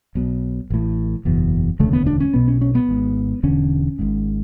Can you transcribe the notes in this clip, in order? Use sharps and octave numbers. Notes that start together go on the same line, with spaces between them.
B1 B2
A1 A2
F#1 E2 B2
E1 D2 C#3 A3
B3
D4
C#4
B1 B2 B3
C#4
C#4
B3
G#1 G#2
E1 E2 D3 C#4
G#1 G#2